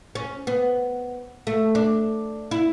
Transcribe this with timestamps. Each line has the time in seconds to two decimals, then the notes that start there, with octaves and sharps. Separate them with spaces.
0.15 C#4
0.47 B3
1.47 A3
1.75 D4
2.51 E4